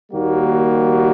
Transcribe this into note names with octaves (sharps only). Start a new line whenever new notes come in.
D#2 D#3 G3 A#3 F#4